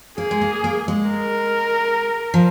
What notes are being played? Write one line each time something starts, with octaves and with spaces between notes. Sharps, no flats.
A#3 G#4
G#3
A#3
A#3
G#3
A#4
F3